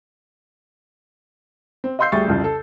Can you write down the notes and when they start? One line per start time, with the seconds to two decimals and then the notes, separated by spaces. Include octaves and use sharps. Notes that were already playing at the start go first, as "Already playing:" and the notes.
1.84 C4
1.99 D#5 F5 C6 E6 G6 C7
2.12 D2 G3 G#4 E5 C#6 A6
2.27 C2 F2 C#3
2.44 A4